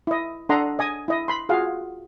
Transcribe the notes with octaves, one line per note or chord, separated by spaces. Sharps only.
E4 D#5
D4 A4 D#5 F#5 A#5 C6
D#5 G#5 D#6
E4 D#5
B5 C6
F4 F#4 G#4 F5